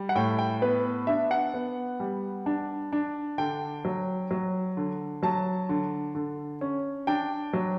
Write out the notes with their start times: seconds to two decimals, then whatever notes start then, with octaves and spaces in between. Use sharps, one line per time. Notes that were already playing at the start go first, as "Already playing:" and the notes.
Already playing: G3
0.09 F#5
0.15 A2 G5
0.39 G5
0.62 B3 B4
1.07 D4 E5
1.31 F#5
1.54 B3
2.00 G3
2.46 D4
2.92 D4
3.38 D3 G5
3.85 F#3
4.31 F#3
4.77 D3
5.23 F#3 A5
5.69 D3
6.15 D3
6.61 C#4
7.07 D4 G5
7.53 F#3